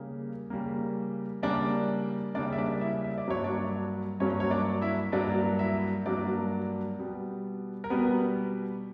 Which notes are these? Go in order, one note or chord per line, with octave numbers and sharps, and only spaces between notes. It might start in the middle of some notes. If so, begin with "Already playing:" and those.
Already playing: C#3 G3 A#3
C#3 G3 A#3
C#3 G3 A#3 D4 D5
C#3 G3 A#3 D4 D5
E5
D4 D5
E4 E5
E5
D5
G2 F#3 A#3 C#5
D4 D5
G2 F#3 A#3 C#4 C#5
C#5
D4 D5
E4 E5
G2 F#3 A#3 D4 D5
E4 E5
G2 F#3 A#3 D4 D5
B2 G3 B3
A#4
B2 G3 B3 B4